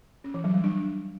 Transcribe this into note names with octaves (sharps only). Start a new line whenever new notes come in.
C#4
E3
F#3
G3
D4